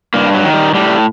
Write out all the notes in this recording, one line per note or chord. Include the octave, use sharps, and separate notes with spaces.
G2 A#3
F#3
D#3
G3
A2 G3